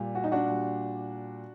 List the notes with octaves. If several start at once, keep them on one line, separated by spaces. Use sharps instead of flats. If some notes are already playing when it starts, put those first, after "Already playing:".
Already playing: A#2 G3
F#4
D#4
D4 F#4
A#2 G3